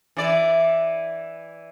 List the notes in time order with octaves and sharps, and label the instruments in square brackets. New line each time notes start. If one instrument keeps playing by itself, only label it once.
[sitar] E3 D5